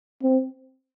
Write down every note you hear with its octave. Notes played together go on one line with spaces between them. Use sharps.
C4